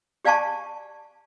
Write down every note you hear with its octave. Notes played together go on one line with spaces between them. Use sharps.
G4 D5 F5 G#5 A5 C#6